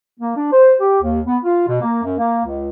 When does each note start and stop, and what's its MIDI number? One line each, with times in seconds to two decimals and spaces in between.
0.19 0.33 58
0.36 0.50 62
0.51 0.74 72
0.80 0.96 67
1.02 1.19 39
1.25 1.37 59
1.43 1.63 65
1.67 1.81 47
1.81 2.02 58
2.03 2.16 42
2.18 2.39 58
2.44 2.69 37